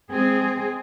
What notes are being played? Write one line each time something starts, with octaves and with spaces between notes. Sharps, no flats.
G#3 C4 G#4